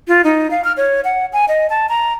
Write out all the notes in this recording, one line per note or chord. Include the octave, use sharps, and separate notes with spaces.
F4
D#4
F5
F6
C#5
F#5
G#5
D#5
A5
A#5